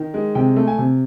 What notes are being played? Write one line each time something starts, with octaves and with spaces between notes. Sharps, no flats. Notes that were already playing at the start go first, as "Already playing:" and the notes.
Already playing: D#3
G#3
C3 G5
A3
G#5
C3